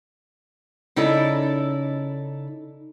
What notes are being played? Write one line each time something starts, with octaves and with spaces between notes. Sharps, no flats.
C#3 D#4 E4 A4 D5